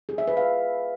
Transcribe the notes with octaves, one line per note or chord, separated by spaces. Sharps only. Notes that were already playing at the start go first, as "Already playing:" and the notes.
G#4
E5
B4
F5